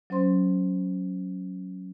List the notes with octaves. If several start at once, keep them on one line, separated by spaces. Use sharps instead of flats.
F#3 C#4 C5 C6